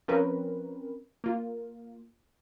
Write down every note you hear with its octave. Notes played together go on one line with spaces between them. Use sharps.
F3 C4 C#4 A#4 B4
A#3 F4